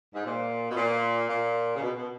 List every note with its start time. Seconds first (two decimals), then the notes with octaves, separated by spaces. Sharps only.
0.14 G#2
0.25 A#2
0.69 B2
0.75 A#2
1.28 A#2
1.75 C#3
1.80 B2
1.95 B2